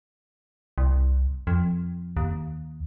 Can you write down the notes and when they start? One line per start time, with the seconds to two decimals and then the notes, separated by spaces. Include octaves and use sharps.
0.78 C2
1.47 F2
2.17 D#2